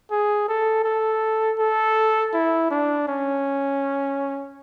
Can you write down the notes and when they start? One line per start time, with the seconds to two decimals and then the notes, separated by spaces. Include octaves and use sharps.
0.11 G#4
0.48 A4
0.84 A4
1.59 A4
2.33 E4
2.71 D4
3.08 C#4